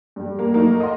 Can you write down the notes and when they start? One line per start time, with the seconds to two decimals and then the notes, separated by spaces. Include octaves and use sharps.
0.16 G2 G3
0.39 A#3 G4
0.52 F#3 A3 A#3 D#4
0.80 D#5 F5 F#5 C6